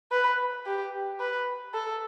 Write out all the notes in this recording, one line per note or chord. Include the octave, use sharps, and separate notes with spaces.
B4
G4
B4
A4